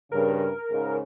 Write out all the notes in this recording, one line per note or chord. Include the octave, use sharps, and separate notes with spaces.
G2 C#3 A#4
G#2 C#3